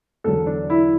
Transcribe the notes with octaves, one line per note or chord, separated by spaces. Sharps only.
E2 D3 F#3 A4
D4
E4